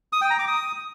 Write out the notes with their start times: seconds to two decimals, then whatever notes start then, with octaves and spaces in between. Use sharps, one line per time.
0.13 D#6
0.21 G5
0.30 A#5
0.39 D6
0.48 D#6